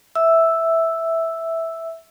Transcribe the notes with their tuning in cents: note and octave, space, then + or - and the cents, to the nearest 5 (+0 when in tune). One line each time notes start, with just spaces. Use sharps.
E5 -5 E6 +0